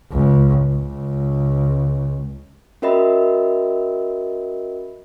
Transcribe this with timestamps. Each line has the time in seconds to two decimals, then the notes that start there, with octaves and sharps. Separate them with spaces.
0.12 C#2
0.74 C#2
2.82 C#4 F#4 A#4 D#5 E5 B5